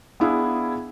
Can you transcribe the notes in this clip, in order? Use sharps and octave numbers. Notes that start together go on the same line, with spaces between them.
B3 D4 E4 G#4 F5